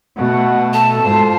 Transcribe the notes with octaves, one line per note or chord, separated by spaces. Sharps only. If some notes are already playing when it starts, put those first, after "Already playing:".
B2 A3 F#5
A4 A5
G#2 F4 C5